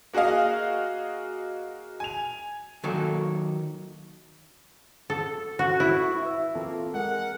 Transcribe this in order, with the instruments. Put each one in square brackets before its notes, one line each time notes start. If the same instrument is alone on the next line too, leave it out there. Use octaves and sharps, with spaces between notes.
[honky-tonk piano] A#3 F#4 G#4 D#5 F5
G#5 F7
[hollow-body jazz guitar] D#3 F#3 A#3 A4
[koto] A4
F#4
E4
[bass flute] B4 [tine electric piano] E5 E6
[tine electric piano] E3 C4 A4 [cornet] A#3 [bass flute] F4
[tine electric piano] G#3 G#4 [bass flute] A#4 [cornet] F#5